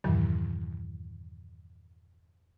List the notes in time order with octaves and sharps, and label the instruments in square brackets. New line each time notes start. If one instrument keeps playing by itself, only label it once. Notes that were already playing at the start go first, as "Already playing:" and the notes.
[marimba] E2 G2 A#2 D#3 E3 F#3